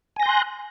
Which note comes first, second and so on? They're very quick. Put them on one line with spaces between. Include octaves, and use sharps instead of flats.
G#5 A#6 G6 C6 F#6